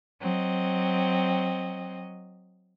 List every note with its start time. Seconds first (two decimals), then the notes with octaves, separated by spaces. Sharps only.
0.20 F#3 C4 D#5